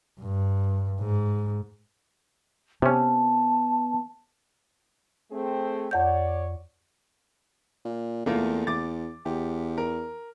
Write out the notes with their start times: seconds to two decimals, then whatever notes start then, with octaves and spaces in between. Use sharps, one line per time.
0.20 G2
1.00 G#2
2.82 C3 B3 C#4 A5
5.31 A3 C4 G#4
5.91 F2 C#5 D5 F#5 G6
7.85 A#2
8.26 E2 A3 A#3 F4
8.67 E2 D6 A6
9.25 E2 G4
9.78 A#4